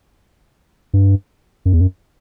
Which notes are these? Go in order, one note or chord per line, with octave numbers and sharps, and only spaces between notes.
G2
F#2
E2
F#2